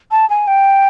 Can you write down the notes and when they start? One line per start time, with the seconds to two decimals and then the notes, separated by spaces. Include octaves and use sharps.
0.11 A5
0.30 G#5
0.47 G5